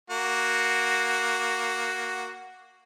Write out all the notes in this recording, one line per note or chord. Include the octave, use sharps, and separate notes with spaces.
A#3 F#4